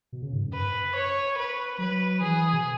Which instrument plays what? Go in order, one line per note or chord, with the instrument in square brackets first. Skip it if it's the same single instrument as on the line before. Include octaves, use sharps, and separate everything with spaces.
[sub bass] B2
C#3
G#2
F#2
[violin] B4
C#5
B4
[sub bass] F#3 [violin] B4
[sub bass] E3 [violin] G#4
[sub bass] B2